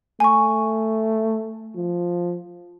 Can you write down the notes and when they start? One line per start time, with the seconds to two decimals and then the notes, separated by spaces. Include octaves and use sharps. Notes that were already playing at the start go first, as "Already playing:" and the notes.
0.20 A3 G#5 C#6
1.75 F3